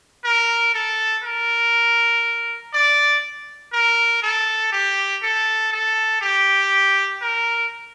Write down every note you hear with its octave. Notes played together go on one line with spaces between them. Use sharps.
A#4
A4
A#4
D5
A#4
A4
G4
A4
A4
G4
A#4